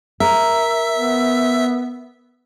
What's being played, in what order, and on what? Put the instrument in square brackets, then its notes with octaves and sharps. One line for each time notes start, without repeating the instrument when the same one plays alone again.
[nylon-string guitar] A#4 [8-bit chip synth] E5
[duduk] B3